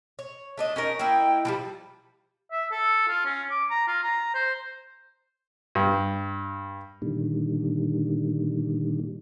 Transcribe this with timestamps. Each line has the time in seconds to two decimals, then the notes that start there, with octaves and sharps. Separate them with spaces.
0.19 C#5
0.58 A3 D4 D#5
0.76 C#4 D#4 A#4
0.99 A#3 E4 D#5 G5
1.45 E3 F3 G3
2.52 E5
2.72 A4
3.08 F4
3.25 C#4
3.51 D6
3.70 A#5
3.88 F4
4.03 A#5
4.34 C5
5.75 G2
7.02 A#2 D3 D#3 G3